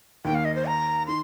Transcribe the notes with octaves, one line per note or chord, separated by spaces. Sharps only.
D#2 D#3 A#3 G5
F5
D#5
C5
A#5
D#3 C6